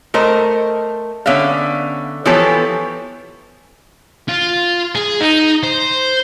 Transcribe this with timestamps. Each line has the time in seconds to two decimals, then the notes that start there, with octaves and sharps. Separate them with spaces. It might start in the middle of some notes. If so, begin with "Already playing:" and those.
0.14 A3 A#4 C5 D#5
1.26 D3 B3 C#4 E5 F5
2.26 E3 F3 B3 G4 A4 C#5
4.29 F4
4.95 G#4
5.21 D#4
5.63 C5